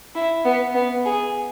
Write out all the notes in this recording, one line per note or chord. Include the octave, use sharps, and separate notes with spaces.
E4
B3
B3
G#4